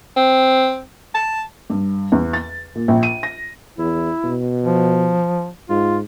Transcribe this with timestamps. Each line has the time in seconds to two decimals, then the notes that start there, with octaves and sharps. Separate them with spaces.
0.17 C4
1.15 A5
1.70 G2
2.12 E2
2.33 A6
2.75 A#2
2.88 A#1
3.03 D#7
3.23 A#6
3.78 E2 E4
4.24 B2
4.65 F3
5.70 G#2 F4